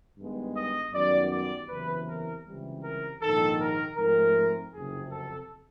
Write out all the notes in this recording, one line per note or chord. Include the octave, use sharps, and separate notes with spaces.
G2 D#3 G#3 B3
D#5
F#2 D#3 G3 B3 D5
D5
F#1 E2 C3 E3 B4
A#4
C#2 C3 E3 G3
A#4
A#1 G#2 D#3 A4
A#4
G#2 F3 A3 C4 A#4
F#1 F2 C3 G#4
A4